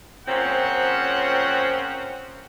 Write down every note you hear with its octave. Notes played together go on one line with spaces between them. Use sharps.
A#2 C#3 F3 C4 C#4 F#5